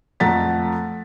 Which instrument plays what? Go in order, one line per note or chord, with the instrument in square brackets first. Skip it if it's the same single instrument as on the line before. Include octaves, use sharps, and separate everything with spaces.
[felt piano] F2 A3 F#5 A#5 A6 B6